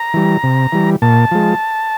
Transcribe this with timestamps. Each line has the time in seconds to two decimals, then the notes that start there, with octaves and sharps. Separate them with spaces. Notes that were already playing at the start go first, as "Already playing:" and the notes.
Already playing: A#5
0.14 E3 G3
0.43 C3
0.72 E3 G3
1.02 A#2 A5
1.31 F3 G#3